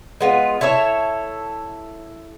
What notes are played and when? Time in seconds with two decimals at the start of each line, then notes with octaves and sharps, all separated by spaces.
0.21 G#3 B3 F4
0.61 E4 A4 C#5 E5